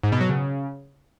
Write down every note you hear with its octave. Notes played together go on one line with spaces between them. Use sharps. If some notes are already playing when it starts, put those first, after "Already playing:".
G#2
B2
F#3
C#3